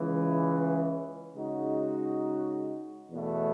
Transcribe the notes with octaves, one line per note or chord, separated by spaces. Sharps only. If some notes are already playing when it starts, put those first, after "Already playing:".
Already playing: C#2 C#3 E3
C#3 G#3 D#4 F#4
E2 B2 A3